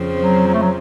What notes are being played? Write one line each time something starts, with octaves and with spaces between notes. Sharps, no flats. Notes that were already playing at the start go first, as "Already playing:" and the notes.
Already playing: F2 C#3 F3 C4
F#3
F#3
A3
F#3